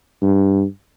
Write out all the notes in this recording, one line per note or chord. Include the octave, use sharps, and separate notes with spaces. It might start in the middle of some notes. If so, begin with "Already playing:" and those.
G2